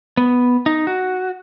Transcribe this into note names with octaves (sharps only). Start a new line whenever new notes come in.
B3
D#4
F#4